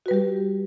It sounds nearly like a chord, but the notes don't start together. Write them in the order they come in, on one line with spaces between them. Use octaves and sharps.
F#4 B4 G3 G4